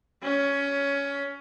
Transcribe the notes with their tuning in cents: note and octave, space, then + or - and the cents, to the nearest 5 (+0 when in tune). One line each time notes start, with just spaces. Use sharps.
C#4 +15